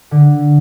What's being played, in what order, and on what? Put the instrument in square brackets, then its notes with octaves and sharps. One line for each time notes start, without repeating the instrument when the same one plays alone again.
[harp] D3